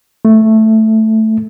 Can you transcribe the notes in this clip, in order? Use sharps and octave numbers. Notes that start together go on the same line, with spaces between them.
A3